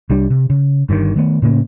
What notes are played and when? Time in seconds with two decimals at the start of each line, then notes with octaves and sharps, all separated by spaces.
0.10 C2 G3 D4
0.30 C3
0.50 C#3
0.89 G1 G2 B2 D#3
1.16 D#3 A3 B3
1.42 A2 C#3 A#3 C#4